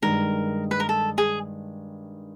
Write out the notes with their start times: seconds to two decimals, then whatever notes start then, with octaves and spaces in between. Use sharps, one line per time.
0.02 G2 D#3 G#3 A#4
0.71 B4
0.80 A#4
0.89 A4
1.18 G#4